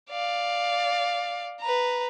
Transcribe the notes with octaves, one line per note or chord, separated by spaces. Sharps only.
D5 F5
B4 A#5